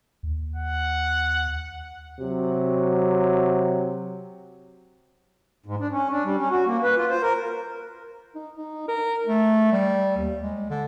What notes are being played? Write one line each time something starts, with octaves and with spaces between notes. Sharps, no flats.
D#2
F#5
C3 F#3
G#2
D4
C#4
D4
G3
C#4
F#4
A#3
B4
F4
C5
A#4
D#4
D#4
A#4
A3
G3
D#2
G#3
D3